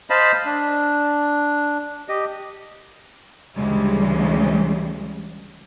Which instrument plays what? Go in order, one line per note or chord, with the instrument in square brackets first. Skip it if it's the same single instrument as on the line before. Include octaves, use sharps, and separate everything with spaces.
[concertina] C5 D#5 F5 A5 B5
D4
G4 D#5
[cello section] D2 C#3 E3 G3 G#3